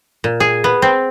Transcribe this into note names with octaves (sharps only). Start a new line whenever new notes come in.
A#2
G#4
B3
C4